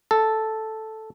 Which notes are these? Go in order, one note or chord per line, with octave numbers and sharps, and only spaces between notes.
A4